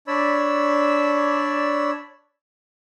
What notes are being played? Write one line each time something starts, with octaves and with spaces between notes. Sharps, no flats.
D4 C#5 D5 B5 E6